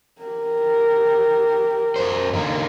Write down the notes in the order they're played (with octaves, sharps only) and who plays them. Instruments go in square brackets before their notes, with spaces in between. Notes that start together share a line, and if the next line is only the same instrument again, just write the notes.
[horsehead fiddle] G4 A#4
[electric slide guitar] F#2 C5
D3 A#3 D#4